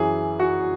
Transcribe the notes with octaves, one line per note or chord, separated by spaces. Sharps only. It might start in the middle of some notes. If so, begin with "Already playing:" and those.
Already playing: F#2 E3 G#4
F#4